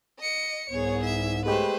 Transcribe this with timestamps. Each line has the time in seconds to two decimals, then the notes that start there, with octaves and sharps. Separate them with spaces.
0.19 D#5 C#7
0.70 C2 G#2 B3 G#4 C#5
1.04 E5
1.46 G#3 A3 G4 B4 C5